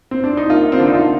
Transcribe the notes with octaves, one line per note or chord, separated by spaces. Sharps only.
C4
D4
D#4
A#3 F4
C4
D3 D4
D#4
F4